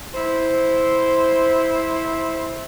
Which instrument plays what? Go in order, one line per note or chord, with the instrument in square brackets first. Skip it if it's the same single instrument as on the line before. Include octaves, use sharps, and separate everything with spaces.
[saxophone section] E4 C5